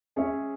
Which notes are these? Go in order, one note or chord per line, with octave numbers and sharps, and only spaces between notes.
G#3 C#4 G#4 C#5 E5